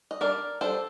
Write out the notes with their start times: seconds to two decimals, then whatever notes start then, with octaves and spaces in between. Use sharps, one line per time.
0.11 D#5
0.21 G3 D4 A#4 D5
0.61 G3 D4 A4 C5